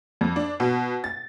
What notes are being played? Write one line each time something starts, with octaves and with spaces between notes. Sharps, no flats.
F2
D4
B2
A6